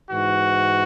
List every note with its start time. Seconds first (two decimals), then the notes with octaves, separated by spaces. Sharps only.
0.09 G#2 E3 F#4